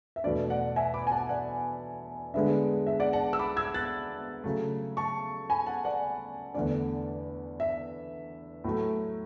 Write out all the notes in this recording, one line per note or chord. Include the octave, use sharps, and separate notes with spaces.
E5
E2 B2 A3 D4 D5
D5 F#5
E5 G#5
B5 D6
G#5
F#5 A5
D5 F#5
D3 G#3 B3 D4 E5
E5
D5 F#5
F#5 A5
E6
B5 D6
E6 G#6
F#6 A6
C#3 F#3 A3
A5 C#6
G#5 B5
F#5 A5
D5 F#5
E2 D3 A3 D4 D5
E5
A2 F#3 A3